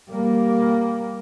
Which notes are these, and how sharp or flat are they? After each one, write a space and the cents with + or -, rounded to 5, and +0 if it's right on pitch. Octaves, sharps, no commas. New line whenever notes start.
G3 +0 A#3 +0